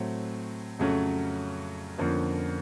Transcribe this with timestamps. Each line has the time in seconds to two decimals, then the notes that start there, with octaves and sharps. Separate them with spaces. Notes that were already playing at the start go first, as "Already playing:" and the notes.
Already playing: A2 F#3 A3 C4
0.79 F2 C#3 F#3 A3 C#4
1.98 F2 D3 F3 A#3 C#4